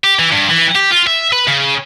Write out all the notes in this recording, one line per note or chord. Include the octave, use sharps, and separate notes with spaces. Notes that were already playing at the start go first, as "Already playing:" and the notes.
G4
E3
G2
E3
G4
F4
E5
B4
C#3